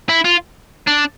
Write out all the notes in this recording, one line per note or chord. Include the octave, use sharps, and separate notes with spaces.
E4
F4
D4